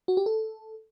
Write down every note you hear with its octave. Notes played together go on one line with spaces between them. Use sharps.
F#4
G4
A4